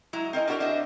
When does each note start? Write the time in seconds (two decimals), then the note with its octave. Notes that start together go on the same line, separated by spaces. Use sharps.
0.13 F#3 G#3 E4 A#5
0.33 C4 A#4 D#5 G#5
0.47 D4 E4 F#4 G4 A#4 D5
0.60 D4 C5 D#5 E5